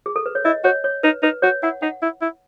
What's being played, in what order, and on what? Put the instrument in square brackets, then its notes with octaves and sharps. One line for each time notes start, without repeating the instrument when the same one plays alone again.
[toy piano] G#4
A4
B4
C#5
[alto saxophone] E4 [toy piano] D#5
[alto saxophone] F#4 [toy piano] C#5
[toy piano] C#5
[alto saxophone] D#4 [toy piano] B4
[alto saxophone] D#4 [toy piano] B4
[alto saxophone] F#4 [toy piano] C#5
[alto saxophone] E4 [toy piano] F#5
[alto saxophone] D#4 [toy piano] F#5
[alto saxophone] E4
E4